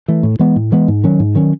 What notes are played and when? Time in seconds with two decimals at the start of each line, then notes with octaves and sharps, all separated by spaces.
0.08 E3 A3
0.23 A2
0.39 E3 G#3 B3
0.56 A2
0.72 E3 G#3 B3
0.88 G#2
1.04 D#3 F#3 C#4
1.20 G#2
1.35 D#3 F#3 C#4